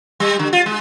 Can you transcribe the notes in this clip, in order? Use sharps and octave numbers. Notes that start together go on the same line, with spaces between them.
G3
D3
F4
G#3